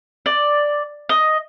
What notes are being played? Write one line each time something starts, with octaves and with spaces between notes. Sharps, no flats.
D5
D#5